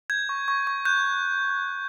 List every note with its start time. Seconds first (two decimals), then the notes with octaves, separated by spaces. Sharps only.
0.10 G6 G#6
0.29 C#6
0.48 C#6
0.67 C#6
0.85 F#6 G6